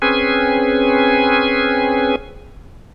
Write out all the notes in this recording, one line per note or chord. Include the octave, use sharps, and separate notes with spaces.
C4 C#4 G#4 B4 G#5